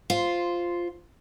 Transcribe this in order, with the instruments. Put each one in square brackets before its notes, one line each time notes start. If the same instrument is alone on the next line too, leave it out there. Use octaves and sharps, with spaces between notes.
[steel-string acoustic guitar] F4 C5